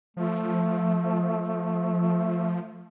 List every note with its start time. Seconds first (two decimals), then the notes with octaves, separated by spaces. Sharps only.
0.17 F3 A3